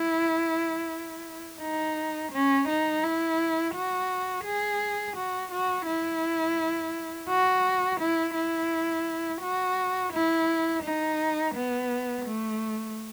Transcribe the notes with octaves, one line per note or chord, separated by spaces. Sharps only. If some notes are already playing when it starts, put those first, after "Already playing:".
Already playing: E4
D#4
C#4
D#4
E4
F#4
G#4
F#4
F#4
E4
F#4
E4
E4
F#4
E4
D#4
B3
A3